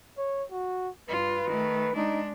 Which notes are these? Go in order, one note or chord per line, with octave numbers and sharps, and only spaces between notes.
C#5
F#4
G2 F4 B4
D#3 A3
G#3 D4 D#4